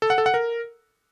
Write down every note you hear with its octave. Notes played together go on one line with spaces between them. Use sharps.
A4
F#5
A4
F#5
A#4